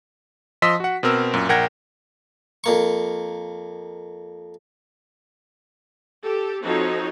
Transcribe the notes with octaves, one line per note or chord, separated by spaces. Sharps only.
F3 D#5 C6 E6 B6
F#4 F#5
B2 C4 A#4 E6
F#2 A#2
A#1 A#4 F#5 G5 G#6 A#6
F2 A#3 C#6
G4 A4
F3 C4 D#4 F#4 A4 C#5